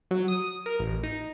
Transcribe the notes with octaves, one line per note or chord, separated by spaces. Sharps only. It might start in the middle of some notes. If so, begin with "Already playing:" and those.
F#3
D#6
A#4
A1
D#4